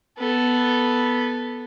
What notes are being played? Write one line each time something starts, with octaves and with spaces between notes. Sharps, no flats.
B3 A4